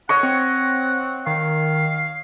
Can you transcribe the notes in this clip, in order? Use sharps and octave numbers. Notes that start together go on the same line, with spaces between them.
C#5 D#5 F#5 C#6
C4
D#3 F5